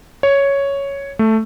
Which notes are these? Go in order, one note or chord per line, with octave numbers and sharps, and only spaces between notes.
C#5
A3